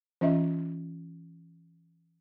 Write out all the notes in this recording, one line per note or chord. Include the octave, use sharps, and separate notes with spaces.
E3 C#4 F4 D#5 E5